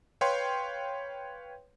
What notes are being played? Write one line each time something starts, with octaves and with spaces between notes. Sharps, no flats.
B4 C#5 F5 G5 C6